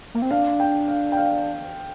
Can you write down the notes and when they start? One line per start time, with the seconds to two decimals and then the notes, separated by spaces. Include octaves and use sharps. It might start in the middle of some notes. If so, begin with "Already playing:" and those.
0.15 A#3
0.22 C4
0.31 D4 F5
0.60 G5
0.88 F5
1.12 G5
1.17 F5